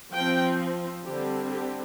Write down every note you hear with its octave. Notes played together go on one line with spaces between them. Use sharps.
F3 C4 G5
D3 G3 C4 G4
G4